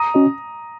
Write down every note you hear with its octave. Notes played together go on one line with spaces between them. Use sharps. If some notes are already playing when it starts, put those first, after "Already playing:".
Already playing: A#5 D#6
C#4 F#4 D#5